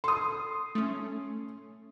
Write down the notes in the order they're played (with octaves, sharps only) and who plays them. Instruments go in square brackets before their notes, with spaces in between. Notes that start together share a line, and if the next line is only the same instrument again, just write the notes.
[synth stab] A4 [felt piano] C6 D#6
[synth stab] A3 C#4